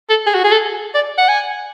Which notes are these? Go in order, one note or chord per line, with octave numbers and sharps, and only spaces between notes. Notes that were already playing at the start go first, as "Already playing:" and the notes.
A4
G#4
F#4
G#4
A4
D5
F#5
G#5